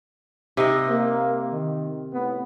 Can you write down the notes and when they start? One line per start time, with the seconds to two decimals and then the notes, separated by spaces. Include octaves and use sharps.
0.57 C3 D#4 D#5
0.89 A#3
1.51 D#3
2.13 A2 B3